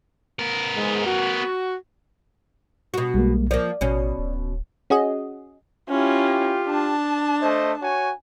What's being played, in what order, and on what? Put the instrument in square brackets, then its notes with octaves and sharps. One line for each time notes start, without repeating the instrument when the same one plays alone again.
[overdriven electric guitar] B3 A#4
[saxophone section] G#2 G#3
F#4
[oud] B2 F#4
[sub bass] B1 [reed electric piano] G3 G#3 A#3
[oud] F3 A#3 [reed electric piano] D5
[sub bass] A1 [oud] B2 C#4
[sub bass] D1
[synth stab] C#4 F#4 G#4 D#5
[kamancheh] C#4 E4 [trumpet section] F4 G4
[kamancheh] D4 A5
[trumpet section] A3 C5 D#5
F#4 C#5 G#5